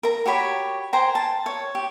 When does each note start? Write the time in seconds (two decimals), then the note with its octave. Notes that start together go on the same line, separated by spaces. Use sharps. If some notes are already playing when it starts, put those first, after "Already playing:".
0.03 A#4 A#5
0.26 F#4 G4 C#5 B5
0.93 C5 G5 G#5 A#5
1.15 A5
1.46 C#5
1.75 G4